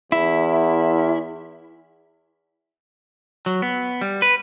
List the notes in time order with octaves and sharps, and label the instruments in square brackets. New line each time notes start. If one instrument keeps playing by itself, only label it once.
[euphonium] E2 [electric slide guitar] E4
[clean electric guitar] F#3
B3
G3
B4